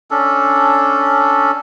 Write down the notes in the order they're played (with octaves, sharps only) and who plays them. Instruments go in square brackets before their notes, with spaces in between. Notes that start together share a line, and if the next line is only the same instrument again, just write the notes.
[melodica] C#4 D4 A4